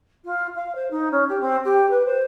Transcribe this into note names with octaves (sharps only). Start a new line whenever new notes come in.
F4
F5
C5
D#4
C#4
G4
C4
G4
B4
C5